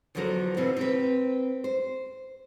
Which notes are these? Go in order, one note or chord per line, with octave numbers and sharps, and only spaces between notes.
E2 D3 F3 F#3 A#4
B2 E3 B3 C4
C4 A#4 B4
C5